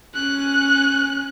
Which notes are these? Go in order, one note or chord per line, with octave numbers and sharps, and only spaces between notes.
C#4 F#6